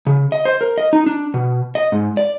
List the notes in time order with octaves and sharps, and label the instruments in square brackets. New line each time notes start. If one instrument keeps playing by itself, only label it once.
[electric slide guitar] C#3
D#5
C5
A#4
D#5
D#4
D4
B2
D#5
G#2
D5